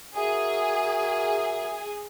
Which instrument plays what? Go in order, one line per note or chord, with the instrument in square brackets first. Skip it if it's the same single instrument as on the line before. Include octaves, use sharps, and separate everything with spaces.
[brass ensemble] F#4 A#4 E5 [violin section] G#4